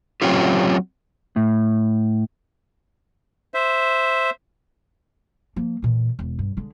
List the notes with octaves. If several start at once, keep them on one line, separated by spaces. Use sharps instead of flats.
F#3 A3 C4 C#4 F4 G4
A2
C5 E5
F3 A#3
A#2 E3
E1
G2
D3 G#3